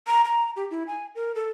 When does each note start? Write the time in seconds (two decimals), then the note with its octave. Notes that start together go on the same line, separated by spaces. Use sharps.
0.07 A#5
0.25 A#5
0.56 G4
0.71 E4
0.87 G#5
1.15 A#4
1.35 A4